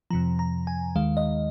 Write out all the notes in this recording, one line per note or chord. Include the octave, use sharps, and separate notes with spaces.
F2 C3 F3 A#5
A#5
G#5
D#2 D#3 G#3 F5
D#5